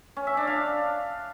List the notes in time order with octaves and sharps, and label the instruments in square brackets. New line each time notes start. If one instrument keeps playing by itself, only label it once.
[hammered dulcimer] C#4
E5
D4
F5